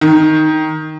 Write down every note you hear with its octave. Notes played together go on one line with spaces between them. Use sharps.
D#3